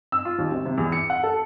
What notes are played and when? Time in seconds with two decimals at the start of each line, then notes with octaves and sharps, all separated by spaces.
0.12 E6
0.25 F4
0.39 D#2
0.52 G#1
0.65 C3
0.78 E2
0.92 C#7
1.10 F#5
1.24 A4